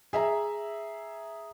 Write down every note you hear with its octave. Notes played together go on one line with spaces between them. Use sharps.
G#4 E5 A#5